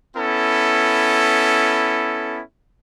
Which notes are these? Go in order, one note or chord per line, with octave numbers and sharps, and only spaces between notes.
B3 C#4 E4 A4